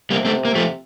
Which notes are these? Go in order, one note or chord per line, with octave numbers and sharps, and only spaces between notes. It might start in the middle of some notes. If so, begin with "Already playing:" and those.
C3 G3 A#3
A3 C4
A#3
F3 A3